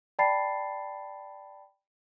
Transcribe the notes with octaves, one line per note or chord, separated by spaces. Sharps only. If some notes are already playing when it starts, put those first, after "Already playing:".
D5 G5 A5 B5 A6 C7